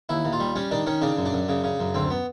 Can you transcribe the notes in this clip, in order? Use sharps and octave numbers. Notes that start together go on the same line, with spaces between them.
D#2 E4
D#2
F4
G3
G3 C#4
D#3 D4
D#3 C#4
C#3 D4
F#2
D4
F#2
C#3
C#3
F#2
D2 C4
B3